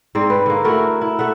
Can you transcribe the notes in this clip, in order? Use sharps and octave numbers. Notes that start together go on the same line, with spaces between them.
G#2 C4 D5
B4
D3 A#3
A3 E4 F#4 A#4
E4
A3 E5 F#5